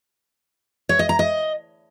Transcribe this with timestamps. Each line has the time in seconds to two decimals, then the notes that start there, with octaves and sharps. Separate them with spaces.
0.89 C#5
0.99 D#5
1.09 A#5
1.19 D#5